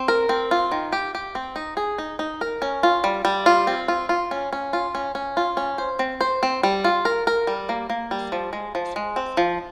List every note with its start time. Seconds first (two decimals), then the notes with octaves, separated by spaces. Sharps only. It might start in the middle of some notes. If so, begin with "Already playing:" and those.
Already playing: C4
0.08 A#4
0.29 C4
0.51 F4
0.72 D#3
0.93 G4
1.15 G4
1.35 C4
1.56 D#4
1.77 G#4
1.98 D#4
2.19 D#4
2.41 A#4
2.62 C#4
2.83 F4
3.04 G3
3.25 G3
3.46 F4
3.67 C4
3.88 F4
4.09 F4
4.31 C#4
4.53 C#4
4.73 F4
4.95 C#4
5.15 C#4
5.37 F4
5.57 C#4
5.78 C5
5.99 C4
6.21 C5
6.43 C4
6.63 G3
6.84 F4
7.05 A#4
7.27 A#4
7.47 G3
7.69 A#3
7.90 A#3
8.11 G3
8.32 F3
8.53 G#3
8.75 F3
8.96 G#3
9.16 C4
9.37 F3